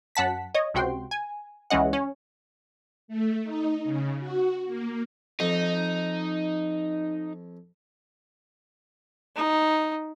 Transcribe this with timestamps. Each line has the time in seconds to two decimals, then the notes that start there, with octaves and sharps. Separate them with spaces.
0.15 F#2 F#5 A5 B6
0.55 C#5 D#5
0.74 C#2 C3 F#4 G5 C6
1.11 G#5
1.70 C#2 E3 G#3 C#4 D#5 F#5
1.93 C#4
3.08 A3
3.43 D#4
3.84 C#3
4.19 F#4
4.67 A#3
5.40 F2 D#4
9.36 D#4